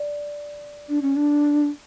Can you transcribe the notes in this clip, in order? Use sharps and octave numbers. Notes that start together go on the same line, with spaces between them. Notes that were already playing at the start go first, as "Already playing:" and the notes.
Already playing: D5
D4
C#4
D4